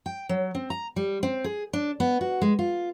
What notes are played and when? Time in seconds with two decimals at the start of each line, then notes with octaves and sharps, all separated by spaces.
0.06 G5
0.29 F#3
0.55 C4
0.70 A#5
0.96 G3
1.23 C4
1.44 G#4
1.73 D4
2.00 B3
2.21 F#4
2.42 G#3
2.59 F4